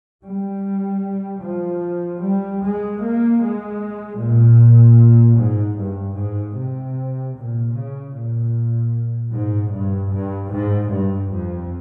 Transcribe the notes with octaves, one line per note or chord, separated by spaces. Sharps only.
G3
F3
G3
G#3
A#3
G#3
A#2
G#2
G2
G#2
C3
A#2
C#3
A#2
G#2
G2
G2
G#2
G2
F2